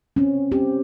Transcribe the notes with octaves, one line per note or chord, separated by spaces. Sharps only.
C4 C#4
C4 G4